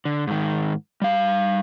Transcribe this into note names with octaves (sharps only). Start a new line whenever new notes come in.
D3
G#2 D#3
G3 F5